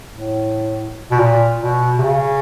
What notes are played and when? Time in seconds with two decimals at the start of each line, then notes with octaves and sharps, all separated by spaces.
0.13 A2
1.11 B2
1.18 A#2
1.61 B2
1.99 C3
2.03 C#3